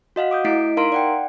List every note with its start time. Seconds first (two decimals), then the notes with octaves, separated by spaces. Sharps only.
0.16 F#4 D#5 F5 F#5
0.31 D6 D#6 G6
0.45 A3 E4 D#5 B6 C7 D7
0.77 D#4 A#4 F5 A#5 C6 D7
0.92 D5 F#5 G5